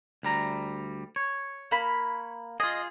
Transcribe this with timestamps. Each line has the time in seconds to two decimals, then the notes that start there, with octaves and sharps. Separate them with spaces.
0.23 D2 G3 A#5
1.16 C#5
1.71 A#3 B5
2.60 F4 G#4 D#5